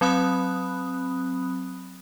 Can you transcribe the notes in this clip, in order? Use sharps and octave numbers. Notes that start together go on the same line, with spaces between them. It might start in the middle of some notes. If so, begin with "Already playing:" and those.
F#3 C4 B5 D#6 F#6